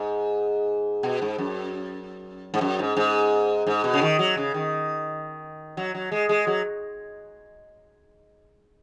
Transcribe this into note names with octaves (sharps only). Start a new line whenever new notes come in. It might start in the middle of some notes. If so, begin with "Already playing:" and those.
Already playing: G#2
B2
G#2
F#2
G#2
F#2
G#2
G#2
G#2
B2
C#3
D#3
F#3
C#3
D#3
F#3
F#3
G#3
G#3
F#3